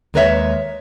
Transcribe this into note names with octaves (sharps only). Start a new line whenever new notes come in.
D#2 G#3 A#4 B4 C#5 E5